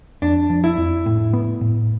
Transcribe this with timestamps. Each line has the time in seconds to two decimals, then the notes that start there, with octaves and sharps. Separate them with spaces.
0.22 F2 D4
0.50 F3
0.64 E4
0.78 F2
1.06 A2
1.33 B3
1.61 A2